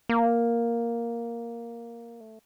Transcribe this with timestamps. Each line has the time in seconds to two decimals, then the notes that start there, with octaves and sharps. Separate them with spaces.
0.09 A#3
2.20 A3